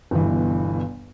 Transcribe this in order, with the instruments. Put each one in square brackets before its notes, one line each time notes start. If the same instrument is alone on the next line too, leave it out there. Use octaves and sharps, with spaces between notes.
[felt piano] G1 G2 B2 E3